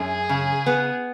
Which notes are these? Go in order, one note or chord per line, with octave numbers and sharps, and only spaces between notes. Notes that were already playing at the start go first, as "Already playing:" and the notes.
Already playing: F#2 G#4
C#3
B3